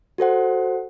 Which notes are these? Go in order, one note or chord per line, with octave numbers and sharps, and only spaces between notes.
F#4 A4 C5 F#5